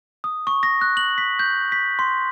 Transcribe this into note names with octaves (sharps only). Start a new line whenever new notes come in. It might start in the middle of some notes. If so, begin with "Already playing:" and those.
D#6
C#6
A#6
F#6
F#7
B6
G6
B6
C6